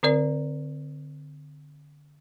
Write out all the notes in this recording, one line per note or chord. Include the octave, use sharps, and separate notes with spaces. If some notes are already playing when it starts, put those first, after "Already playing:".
D3 C4 A#4 D5